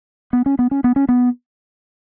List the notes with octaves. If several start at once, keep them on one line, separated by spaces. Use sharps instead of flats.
B3
C#4
B3
C#4
B3
C#4
B3